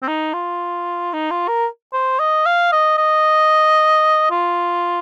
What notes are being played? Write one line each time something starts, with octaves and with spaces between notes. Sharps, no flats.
C4
D#4
F4
D#4
F4
A#4
C5
D#5
F5
D#5
D#5
F4